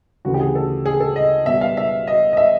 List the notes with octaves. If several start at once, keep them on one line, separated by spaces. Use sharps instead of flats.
D2 C#3 E3 A3 F#4
G4
G#4
A4
G#4
A4
D#5
B2 G3 B3 E5
F5
E5
D#5
D#5
E5